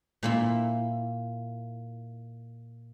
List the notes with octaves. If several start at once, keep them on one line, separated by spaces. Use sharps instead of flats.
A#2 A#3 E4